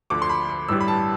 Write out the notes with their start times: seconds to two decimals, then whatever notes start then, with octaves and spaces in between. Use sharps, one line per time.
0.10 D2 D3 F3 D6
0.22 C6
0.29 B5
0.49 B5
0.68 A1 G2 E3 G3 E6
0.80 B5
0.88 A5